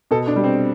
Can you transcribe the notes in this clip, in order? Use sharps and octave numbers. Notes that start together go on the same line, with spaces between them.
B2 A4
D4
G3
C4